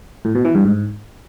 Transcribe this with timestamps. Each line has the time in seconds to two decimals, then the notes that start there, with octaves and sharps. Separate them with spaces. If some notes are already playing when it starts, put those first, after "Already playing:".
0.25 A2
0.35 B2
0.45 E3
0.55 G2
0.65 G#2